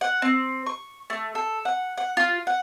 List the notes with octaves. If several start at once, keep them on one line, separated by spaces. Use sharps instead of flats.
F#5
C4
C#6
A3
A4
F#5
F#5
F4
F#5